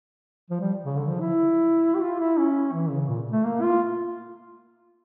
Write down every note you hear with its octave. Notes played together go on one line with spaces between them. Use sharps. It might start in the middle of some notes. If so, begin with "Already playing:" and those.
F3
G3
C#3
D3
F3
E4
G4
F4
E4
C#4
E3
C#3
A#2
A3
A#3
F4